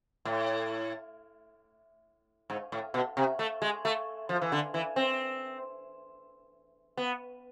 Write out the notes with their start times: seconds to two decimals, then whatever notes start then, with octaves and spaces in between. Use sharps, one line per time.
0.25 A2
2.50 G#2
2.72 A2
2.94 B2
3.17 C3
3.39 A3
3.62 G#3
3.85 A3
4.29 F3
4.42 E3
4.52 D3
4.74 E3
4.96 C4
6.97 B3